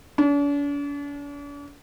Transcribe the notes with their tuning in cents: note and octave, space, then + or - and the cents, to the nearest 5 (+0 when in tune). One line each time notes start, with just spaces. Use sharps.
D4 -45